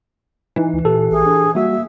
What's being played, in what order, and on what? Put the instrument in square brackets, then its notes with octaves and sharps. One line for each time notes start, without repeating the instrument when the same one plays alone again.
[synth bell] E3 [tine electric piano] D#4 E4
[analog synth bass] D2
[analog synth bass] A#2 [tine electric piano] G4 A4
[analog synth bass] A#1 [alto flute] G#4
[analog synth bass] D4
[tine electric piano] G3 F#4 [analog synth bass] A#3 [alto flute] E5